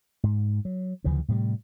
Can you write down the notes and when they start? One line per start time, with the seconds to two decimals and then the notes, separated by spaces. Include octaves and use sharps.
0.24 G#2
0.65 F#3
1.04 D2 C#3 E3 F3
1.28 A2 C3 F3 G3